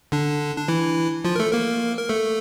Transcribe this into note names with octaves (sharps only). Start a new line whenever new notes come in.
D3 D4
D4
E3 E4
F3 F4
A#4
A3 A4
A#3 A#4
A#4
A3 A4